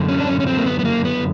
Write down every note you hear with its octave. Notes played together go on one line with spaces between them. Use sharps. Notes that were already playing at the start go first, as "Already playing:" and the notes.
Already playing: F#2 D3
C#4
D4
C#4
C#4
C4
A#3
B3
B3
A#3
B3